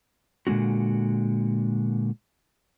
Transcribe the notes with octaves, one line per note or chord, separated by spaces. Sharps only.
A#2 D3 G#3 C#4 F#4